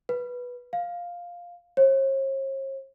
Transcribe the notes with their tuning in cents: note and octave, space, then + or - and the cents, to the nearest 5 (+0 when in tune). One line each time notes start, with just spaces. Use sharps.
B4 -10
F5 +5
C#5 -45